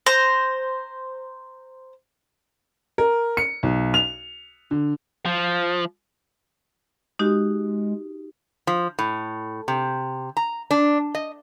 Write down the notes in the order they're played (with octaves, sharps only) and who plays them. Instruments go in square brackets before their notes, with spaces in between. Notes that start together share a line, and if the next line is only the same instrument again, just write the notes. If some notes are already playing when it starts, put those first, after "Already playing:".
[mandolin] C5 A#5
[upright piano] A#4
C#7
B1
F7
D3
[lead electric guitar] F3
[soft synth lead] G#3 [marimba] D#4 F#4 G4
[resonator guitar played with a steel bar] F3
A2
C3
A#5
D4
D#5